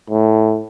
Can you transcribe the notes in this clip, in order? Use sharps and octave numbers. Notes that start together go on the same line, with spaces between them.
A2